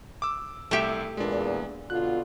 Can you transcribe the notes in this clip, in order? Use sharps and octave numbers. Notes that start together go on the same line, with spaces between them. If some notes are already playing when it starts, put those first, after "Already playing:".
D6 E6
C2 A3 G4 E5
E2 A#2 G#3 D4
B2 D3 F4 F#6